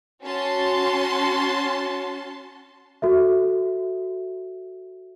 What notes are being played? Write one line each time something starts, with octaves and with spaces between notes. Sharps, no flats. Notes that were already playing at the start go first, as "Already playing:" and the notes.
C#4 F#4 A5 C6
F#4 A4 E5